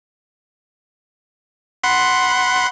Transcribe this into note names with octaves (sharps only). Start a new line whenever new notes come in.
F#5 B5 C6